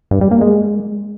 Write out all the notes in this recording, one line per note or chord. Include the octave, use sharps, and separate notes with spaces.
G2
G3
A#3
G#3